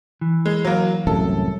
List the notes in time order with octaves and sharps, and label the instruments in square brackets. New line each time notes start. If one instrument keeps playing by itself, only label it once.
[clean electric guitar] E3
[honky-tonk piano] G#3
F#3 A#3
[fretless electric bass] C2 F#2 A2 [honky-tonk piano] A4